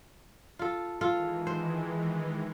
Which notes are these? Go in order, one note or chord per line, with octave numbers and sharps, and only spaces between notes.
F4 A4
D#3 E3 G#3 F4 A4
C5